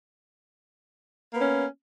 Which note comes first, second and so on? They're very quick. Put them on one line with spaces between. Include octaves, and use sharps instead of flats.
A#3 B3 C#4